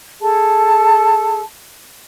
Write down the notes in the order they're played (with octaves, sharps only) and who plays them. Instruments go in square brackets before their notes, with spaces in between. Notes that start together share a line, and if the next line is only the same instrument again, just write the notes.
[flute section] G#4 A4 A5